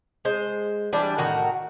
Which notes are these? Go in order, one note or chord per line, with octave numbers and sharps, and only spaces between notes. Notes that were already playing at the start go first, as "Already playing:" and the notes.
G#3 C5
E3 G3 D4
A2 D#3 F#4 A#4